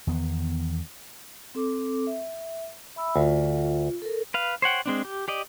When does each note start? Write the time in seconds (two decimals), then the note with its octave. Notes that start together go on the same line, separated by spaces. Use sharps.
0.07 E2 D#3 B3
1.55 C4 A4 D6
2.07 E5
2.96 E5 B5 E6
3.16 D2 F4
4.02 A4 A#4
4.34 B4 F5
4.62 C5 C#5 F#5 G5
4.86 G#3 C4 D4
5.05 G4
5.28 G4 D5 D#5